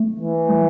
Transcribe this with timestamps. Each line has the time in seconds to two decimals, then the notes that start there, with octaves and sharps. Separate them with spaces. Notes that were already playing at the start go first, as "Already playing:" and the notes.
Already playing: A3
0.19 E3
0.49 G3